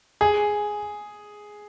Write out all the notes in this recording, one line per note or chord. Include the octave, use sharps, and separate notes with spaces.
G#4